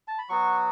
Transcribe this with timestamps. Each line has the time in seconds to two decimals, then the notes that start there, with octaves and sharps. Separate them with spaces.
0.08 A5
0.18 B5
0.29 F#3 B3 F#4 C#6